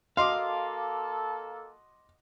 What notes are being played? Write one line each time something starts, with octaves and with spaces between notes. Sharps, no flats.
A#3 F#4 A4 D#5 F5 C6 D6